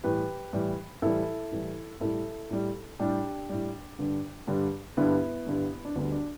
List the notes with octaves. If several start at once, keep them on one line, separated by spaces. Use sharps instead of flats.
A2 E3 G3 G4 B4
A2 E3 G3
A2 E3 G3 E4 A4
A2 E3 G3
A2 G3 E4 A4
A2 G3
A2 G3 D4 G4
A2 G3
G2 D3 G3
G2 D3 G3
G2 D3 G3 B3 E4
G2 D3 G3
D4
D2 D3 G3 B3
D4